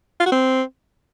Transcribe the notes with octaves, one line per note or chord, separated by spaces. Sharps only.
F4
F#4
C4